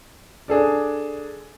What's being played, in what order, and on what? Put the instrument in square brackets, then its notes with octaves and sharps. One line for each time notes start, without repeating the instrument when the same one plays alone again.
[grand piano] D4 G#4 A4 D5